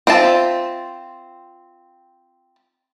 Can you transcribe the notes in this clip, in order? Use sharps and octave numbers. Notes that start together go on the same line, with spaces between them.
C4 F4 E5 A5